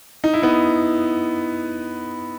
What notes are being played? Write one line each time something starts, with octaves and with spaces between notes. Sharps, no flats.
D#4
E4
B3 D#4